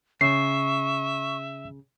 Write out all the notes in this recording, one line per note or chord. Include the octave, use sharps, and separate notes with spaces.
C#3 E5 C#6 C7